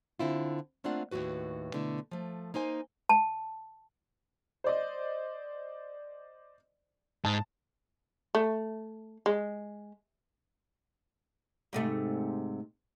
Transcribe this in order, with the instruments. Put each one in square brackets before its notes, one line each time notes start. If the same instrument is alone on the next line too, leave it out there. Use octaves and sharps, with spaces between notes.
[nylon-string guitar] D3 C4 E4 F4
A3 A#3 C4 D4 F4 F#5
D#2 A2 D#3 F#4 B4
B2 D3 A3 E4
F3 A3
A#3 D#4 C5 G#5
[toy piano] A5
[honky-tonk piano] C5 D5 D#5
[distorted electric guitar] G#2 [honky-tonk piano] A5
[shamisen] A3
G#3
[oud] G#2 C3 A3